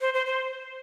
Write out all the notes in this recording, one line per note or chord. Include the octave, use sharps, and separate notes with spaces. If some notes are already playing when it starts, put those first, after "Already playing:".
C5
C5
C5